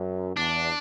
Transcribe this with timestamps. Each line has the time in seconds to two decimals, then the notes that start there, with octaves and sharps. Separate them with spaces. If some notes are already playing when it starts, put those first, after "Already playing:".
Already playing: F#2
0.36 E2 D4